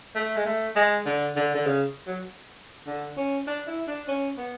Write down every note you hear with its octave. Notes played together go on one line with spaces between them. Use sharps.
A3
G#3
A3
G#3
D3
D3
D3
C#3
F#3
D3
C#4
D4
E4
D4
C#4
B3